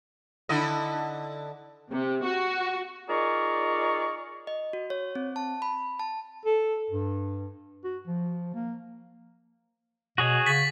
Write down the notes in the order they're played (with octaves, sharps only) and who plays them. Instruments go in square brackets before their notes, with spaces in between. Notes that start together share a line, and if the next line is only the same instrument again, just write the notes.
[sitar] D3 E4 D#5
[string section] C3
F#4
[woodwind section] D#4 F4 G#4 A#4 D5 C#6
[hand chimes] D#5
F#4
C#5
C4
A5
B5
A5
[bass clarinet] A4
G2
F#4
F3
A#3
[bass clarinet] B2 [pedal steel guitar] F#4 G#4 C#5
[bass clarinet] C#3 [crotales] A6 B6 F#7